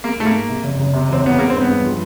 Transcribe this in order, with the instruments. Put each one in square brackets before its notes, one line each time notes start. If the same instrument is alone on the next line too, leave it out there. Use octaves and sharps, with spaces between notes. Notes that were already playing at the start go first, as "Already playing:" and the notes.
[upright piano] G#3 [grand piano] A#3
[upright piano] G#2 [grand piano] A3
[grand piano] A#3
[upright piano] G#2
C3
F#1
F#1
C3
[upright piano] E1 [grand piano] C4
[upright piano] E1 [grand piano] B3
[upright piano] G#3 [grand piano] A#3
[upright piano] G2 [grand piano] C4
[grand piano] B3
[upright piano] G2
F3